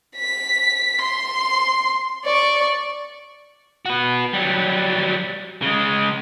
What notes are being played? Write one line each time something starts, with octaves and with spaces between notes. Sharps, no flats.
B6
C6
D5 C#6
F#4 B4
F#3 G3
C#3 G#3